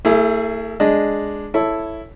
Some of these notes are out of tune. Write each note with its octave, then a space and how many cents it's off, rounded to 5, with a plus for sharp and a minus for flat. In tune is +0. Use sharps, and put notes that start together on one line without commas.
A3 +40 E4 +0 G#4 +0
G#3 +0 D4 +0 D#5 +0
E4 +0 A4 +0 C#5 +0